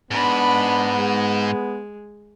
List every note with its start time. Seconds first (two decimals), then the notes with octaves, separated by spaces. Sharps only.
0.11 G#2 B3 D4 B5
0.98 G#3